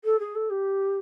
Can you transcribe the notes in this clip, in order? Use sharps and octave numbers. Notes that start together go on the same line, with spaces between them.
A4
G#4
A4
G4